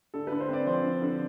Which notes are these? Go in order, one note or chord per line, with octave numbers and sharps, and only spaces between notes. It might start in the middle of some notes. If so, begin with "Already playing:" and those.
D3 A4
D3 B4
C5
C4 D5
F3 C5
D3
D3